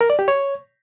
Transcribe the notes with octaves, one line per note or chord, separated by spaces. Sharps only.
A#4
D5
G4
C#5